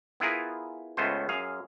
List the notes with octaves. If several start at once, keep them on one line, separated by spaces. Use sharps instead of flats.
B3 E4 F4 G#4 A#4
C#2 A3 B3 C#4 C5
F#2 G#4 F5